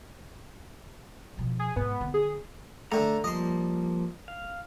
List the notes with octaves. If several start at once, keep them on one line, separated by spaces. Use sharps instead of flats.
B2 F3
G#4
G#2 B3
D3
G#4
D3 A3 A#5
F3 G3 A#3 D#5 C6
F5